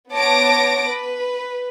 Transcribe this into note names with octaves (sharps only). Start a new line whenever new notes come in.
B3 C#5 A5 D6 A#6 D7
B4